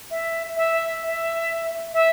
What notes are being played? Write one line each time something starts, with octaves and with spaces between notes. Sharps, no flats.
E5
E5
E5
E5